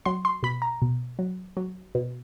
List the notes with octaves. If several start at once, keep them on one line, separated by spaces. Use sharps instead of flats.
F#3 C6
C6
B2 B5
A#5
B2
F#3
F#3
B2